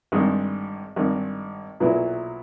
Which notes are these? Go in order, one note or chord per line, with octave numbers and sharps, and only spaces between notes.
G#1 G2 D#3 G#3
G#1 G2 D#3 G#3
B1 A#2 F#3 B3 E4